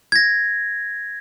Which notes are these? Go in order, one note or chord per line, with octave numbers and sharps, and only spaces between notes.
G#6 A#6